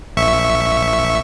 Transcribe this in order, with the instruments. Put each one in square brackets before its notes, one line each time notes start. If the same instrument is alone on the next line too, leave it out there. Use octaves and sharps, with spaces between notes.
[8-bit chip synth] A#1 E5 C#6